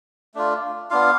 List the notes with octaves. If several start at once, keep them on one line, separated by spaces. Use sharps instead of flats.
A3 D4 F4
B3 D4 F4 F5